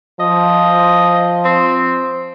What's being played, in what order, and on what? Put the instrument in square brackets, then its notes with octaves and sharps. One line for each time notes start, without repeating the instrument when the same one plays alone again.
[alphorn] F3 [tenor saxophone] D#5
[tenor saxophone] C4